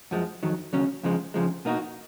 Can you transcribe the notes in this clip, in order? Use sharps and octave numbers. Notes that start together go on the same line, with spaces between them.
F#2 F3 G#3
F2 D#3 F#3
D#2 C#3 F#3 C#4
F2 C#3 F3 G#3
F2 C#3 F3 G#3
B2 A#3 D#4 F#4